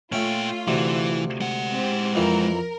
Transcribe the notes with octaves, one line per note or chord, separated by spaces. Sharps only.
A#2 A3 C#4 F4 G5
D2 C3 E3
G#3 F#5
C4 G4
F2 E3 A#4